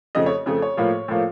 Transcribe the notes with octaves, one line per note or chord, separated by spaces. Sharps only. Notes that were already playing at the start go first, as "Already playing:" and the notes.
F2 C#3 A3 D#5
C#5
F2 C#3 A3
C#5
A2 F3 A#3 F4
A2 F3 A#3 F4